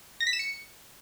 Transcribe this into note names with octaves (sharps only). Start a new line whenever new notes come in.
A#6
B6
E7
C#7